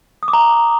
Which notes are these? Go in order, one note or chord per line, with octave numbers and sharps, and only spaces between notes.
D#6
D6
A#5